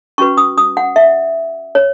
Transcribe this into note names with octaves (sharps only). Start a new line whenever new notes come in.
C#4 F#4 B4 C#6
D#6
D#6
F#5
E5
C#5